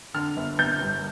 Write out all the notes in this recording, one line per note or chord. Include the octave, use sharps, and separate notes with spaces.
D3 F6
G1
G1 G6
G2